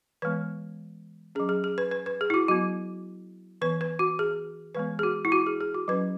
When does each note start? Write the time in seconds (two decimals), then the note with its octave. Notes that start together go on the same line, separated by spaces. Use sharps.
0.22 E3 G#3 B3 B4
1.35 C#4 G#4
1.40 F#3
1.49 G#4
1.64 G#4
1.78 B4
1.91 B4
2.06 B4
2.21 G#4
2.30 E4
2.34 F#4
2.48 F#3 B3 F#4
3.61 E3 B3 B4
3.81 B4
3.99 F#4
4.19 G#4
4.75 E3 G#3 B3 B4
4.99 G#4
5.03 F#4
5.25 E4
5.32 F#4
5.46 G#4
5.61 G#4
5.74 F#4
5.88 F#3 C#4 B4